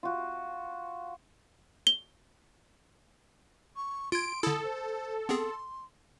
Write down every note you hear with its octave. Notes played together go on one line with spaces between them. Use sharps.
F4 F#4
G7
C#6
F4 C6 G#6 D7
D3 E4 A4 D#6
C5
B3 C4 G#4 C6